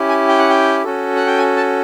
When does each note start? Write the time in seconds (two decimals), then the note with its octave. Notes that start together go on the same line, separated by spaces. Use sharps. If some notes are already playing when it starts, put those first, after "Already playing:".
Already playing: C#4 E4 G4
0.09 G#5
0.28 G5
0.39 F#5
0.49 G5
0.84 C#4 F#4 A4
1.16 F#5
1.27 G5
1.38 G#5
1.57 A5